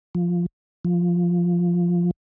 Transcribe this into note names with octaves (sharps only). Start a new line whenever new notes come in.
F3
F3